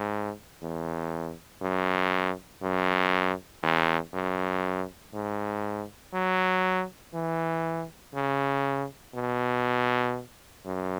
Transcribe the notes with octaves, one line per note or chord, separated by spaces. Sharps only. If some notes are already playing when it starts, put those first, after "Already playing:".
Already playing: G#2
E2
F#2
F#2
E2
F#2
G#2
F#3
E3
C#3
B2
F#2